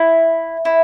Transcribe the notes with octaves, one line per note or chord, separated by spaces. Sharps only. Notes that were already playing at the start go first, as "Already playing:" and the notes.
Already playing: E4
E4